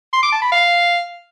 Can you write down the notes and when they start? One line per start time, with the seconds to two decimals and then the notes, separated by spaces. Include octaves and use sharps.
0.13 C6
0.23 D6
0.32 A5
0.42 B5
0.52 F5